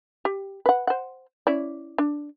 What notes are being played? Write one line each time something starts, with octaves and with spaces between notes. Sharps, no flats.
G4
B4 F#5
C5 F#5
C#4 E4 D5
D4